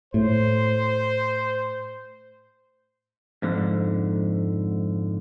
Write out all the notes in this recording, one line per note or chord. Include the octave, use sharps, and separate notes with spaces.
A2 C5
F2 G#2 D3